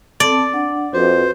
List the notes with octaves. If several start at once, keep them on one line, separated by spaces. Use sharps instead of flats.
C4 D5 A5
D4 F#5
F2 F#4 B4 C5